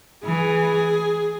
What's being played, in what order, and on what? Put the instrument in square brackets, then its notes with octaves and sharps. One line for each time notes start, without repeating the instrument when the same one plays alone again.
[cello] E3 [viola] G#4